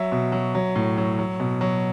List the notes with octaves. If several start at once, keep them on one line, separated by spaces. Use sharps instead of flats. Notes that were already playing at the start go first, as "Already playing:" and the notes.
Already playing: F#3 E5
B2
F#3
F#3
A2
F#3
F#3
B2
F#3